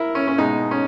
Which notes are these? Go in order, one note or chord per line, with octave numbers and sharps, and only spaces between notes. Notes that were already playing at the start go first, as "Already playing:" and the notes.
Already playing: E4 A#4
C#4
C#4
B2 G#3 D#4
C#4